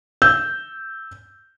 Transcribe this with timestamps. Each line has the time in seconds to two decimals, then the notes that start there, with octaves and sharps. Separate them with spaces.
0.22 E6 G6